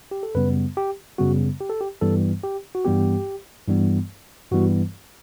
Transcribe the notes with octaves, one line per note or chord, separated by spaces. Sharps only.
G4
A4
F#2 C#3 G3 B3 B4
G4
F#2 C#3 G3 B3 F#4
G4
A4
G4
G2 E3 G3 B3 A4
G4
F#4
G2 E3 G3 B3 G4
G2 E3 G3 B3
G2 E3 G3 B3 F#4